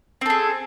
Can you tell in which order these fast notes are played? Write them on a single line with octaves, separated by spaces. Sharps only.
C4 A4 G#4